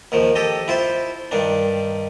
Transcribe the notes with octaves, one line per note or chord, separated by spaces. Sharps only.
D#2 D#3 F3
G4 A4 D#5
E4 F4 C5
G2 D#3 D4